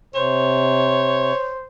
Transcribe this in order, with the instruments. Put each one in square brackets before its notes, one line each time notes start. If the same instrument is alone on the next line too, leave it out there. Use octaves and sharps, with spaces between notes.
[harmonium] C3 [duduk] C5 [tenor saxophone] C#5